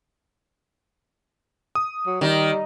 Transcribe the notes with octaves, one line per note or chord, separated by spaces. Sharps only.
D#6
F#3
D#3 G3